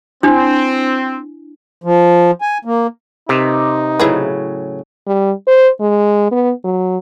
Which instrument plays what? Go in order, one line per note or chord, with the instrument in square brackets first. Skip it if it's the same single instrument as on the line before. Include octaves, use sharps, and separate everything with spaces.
[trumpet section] C4 [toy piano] D4 E4
[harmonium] F3
G#5
A#3
[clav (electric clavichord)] C3 [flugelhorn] D#4 [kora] A#4 B4
[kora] A2 C#3 F#3 [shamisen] E4 G#4 B4
[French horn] G3
C5
G#3
B3
F#3